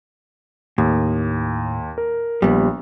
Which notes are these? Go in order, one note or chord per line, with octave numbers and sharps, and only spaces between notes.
D#2 A2
A#4
A#1 G3 B3